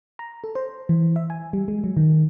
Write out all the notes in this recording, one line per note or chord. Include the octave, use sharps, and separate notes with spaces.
A#5
A4
C5
E3
E5
G#5
G3
G#3
F#3
D#3